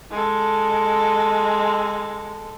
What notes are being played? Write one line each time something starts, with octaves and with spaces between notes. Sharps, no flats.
G#3 A4